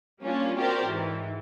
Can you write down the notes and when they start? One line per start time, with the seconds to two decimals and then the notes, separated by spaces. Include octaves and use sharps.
0.22 G3 A#3 C#4 D4 F4
0.57 C4 F#4 G4 A#4 C5 D5
0.86 G#2 E3